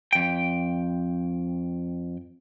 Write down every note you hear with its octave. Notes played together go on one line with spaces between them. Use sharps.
F2 G5